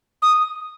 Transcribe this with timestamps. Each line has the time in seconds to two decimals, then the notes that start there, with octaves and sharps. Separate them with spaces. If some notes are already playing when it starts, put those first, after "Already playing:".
0.22 D#6